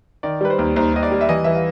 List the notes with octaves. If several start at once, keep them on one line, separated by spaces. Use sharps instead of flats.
D#3 D5
G3 B4
C5
D#2
D#2 C5
D#2 D#5
D5
G3
E5
E3 D#5
E3 E5
F5